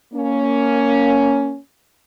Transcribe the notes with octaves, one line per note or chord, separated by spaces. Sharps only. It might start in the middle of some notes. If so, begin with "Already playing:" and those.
A#3 C#4